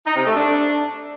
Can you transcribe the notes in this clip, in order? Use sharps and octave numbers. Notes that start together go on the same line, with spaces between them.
D#4
C3
A3
D4